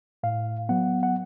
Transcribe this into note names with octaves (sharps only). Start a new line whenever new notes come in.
A2 F5
F#3 B3 F#5
F#5